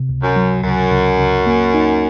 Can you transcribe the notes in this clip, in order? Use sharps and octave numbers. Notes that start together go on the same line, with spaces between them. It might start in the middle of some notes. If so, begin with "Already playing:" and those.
Already playing: C3
C#2
F#2
F#3
C#2 F#2
C#2
C#2
A#3
D#4